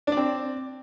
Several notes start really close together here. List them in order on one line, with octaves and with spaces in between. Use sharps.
D4 D5 C4